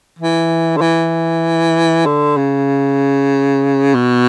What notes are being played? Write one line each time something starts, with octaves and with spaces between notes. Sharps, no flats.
E3
D3
E3
D3
C#3
B2